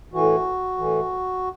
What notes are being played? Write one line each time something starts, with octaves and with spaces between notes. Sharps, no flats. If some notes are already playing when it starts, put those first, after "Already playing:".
A2 E3 F#4
A2 E3